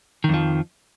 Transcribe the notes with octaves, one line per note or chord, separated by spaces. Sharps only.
F2 D#3 F3